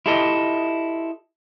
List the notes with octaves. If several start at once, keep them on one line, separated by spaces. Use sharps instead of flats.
E4 F4 G4 A4 D#5 E5